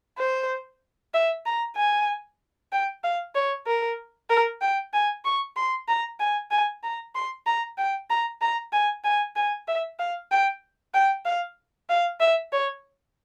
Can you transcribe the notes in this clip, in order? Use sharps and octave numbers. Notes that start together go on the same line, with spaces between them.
C5
E5
A#5
G#5
G5
F5
C#5
A#4
A#4
G5
G#5
C#6
C6
A#5
G#5
G#5
A#5
C6
A#5
G5
A#5
A#5
G#5
G#5
G#5
E5
F5
G5
G5
F5
F5
E5
C#5